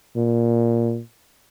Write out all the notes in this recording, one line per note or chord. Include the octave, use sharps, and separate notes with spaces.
A#2